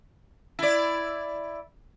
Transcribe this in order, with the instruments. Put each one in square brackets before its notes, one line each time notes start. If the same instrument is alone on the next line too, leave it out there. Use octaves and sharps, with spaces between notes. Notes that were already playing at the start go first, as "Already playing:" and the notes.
[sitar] E4 D5